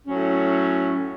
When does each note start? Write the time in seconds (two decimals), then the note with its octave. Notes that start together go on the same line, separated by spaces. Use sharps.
0.07 A2 F#3 C#4